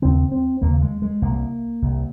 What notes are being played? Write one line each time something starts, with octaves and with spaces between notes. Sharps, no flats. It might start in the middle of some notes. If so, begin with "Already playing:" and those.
D#2 C#3 C4
C4
D#2 C#3 A#3
G#3
G#3
C2 C3 A#3
C2 C3